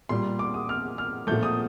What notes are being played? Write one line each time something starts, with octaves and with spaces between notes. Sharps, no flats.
A#2 G3 C6
D6
D#6
F6
F6
A#2 F3 A3 G6
D#6